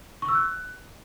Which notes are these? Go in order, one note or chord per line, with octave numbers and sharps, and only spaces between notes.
C#6
E6
F#6